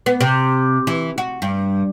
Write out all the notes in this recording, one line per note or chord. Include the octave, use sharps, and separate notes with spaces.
B3
C3
E3
F#4
G2